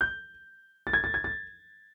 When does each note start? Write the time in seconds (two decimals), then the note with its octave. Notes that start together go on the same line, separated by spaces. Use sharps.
0.01 G6
0.87 A6
0.93 G#6
1.04 A6
1.14 G#6
1.24 A6